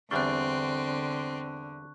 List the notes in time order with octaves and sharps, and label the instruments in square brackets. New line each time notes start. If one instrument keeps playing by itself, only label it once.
[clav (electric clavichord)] E2 G3 D4 [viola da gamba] D3 [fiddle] C4 [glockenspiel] C#6 F#6